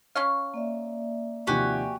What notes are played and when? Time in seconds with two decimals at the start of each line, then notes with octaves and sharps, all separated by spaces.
0.15 C#4 C#5 F5
0.54 A#3 D5 E5
1.47 D#2 C3 F3 F#4 G4 G#5